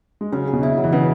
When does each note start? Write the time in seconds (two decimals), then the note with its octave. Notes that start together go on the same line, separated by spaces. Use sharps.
0.21 G#3
0.32 C#3 F#3 C#4
0.47 G#4
0.53 B2
0.62 C#3 E4
0.77 F#3
0.84 E3
0.92 C#3 B3